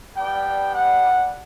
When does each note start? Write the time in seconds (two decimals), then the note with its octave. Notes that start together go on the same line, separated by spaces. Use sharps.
0.16 G3 B3 D4 G5
0.74 F#5